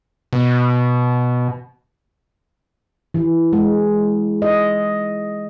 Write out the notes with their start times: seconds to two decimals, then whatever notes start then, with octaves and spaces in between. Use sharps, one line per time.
0.33 B2
3.14 E3
3.53 G#3
4.42 D#5